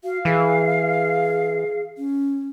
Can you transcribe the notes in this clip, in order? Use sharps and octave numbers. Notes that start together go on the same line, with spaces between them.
F#4 F5
E3 G#4
C#4